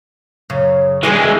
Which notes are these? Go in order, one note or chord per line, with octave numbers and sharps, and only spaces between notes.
F#2 C#3
E3 G3 G#3 G#4 D#5